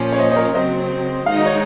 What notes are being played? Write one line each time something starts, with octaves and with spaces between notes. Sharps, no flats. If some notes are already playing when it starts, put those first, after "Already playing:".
Already playing: A#2 F3 A#3 C#4 C5
C#5
C5 D#5
D#5
A#4 C#5
C#3 F#3 C4 C5 D#5
D#3 G#3 D#4 F#4 F5
D#5
C#5